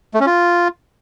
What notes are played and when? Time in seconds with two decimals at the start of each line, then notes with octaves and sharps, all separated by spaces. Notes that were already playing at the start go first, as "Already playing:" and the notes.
0.14 A3
0.20 C#4
0.27 F4